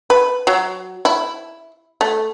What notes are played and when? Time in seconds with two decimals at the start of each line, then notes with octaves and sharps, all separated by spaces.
0.10 B4
0.47 F#3
1.05 E4
2.01 A3